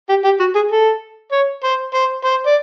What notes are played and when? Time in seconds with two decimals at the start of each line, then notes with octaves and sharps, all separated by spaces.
0.09 G4
0.24 G4
0.39 F#4
0.55 G#4
0.71 A4
1.32 C#5
1.64 C5
1.94 C5
2.24 C5
2.46 D5